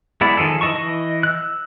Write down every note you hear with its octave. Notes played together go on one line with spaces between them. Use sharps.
G#3 B3 E4 D5
D#3 F3 G#4 A4
E3 D#5 A5 C#6
E3 D#5
E6 F#6